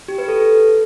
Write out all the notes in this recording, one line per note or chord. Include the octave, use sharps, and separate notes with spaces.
G4
B4
A4